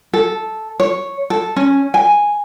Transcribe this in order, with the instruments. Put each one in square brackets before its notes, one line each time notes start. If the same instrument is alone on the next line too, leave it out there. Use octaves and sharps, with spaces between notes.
[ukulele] A4
C#5
A4
C#4
G#5